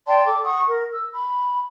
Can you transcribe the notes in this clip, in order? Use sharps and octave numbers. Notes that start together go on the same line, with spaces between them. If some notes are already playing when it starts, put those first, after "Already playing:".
D5 G5 A5 C6
A4 D6
F#5 C#6 D#6
A#4
E6
B5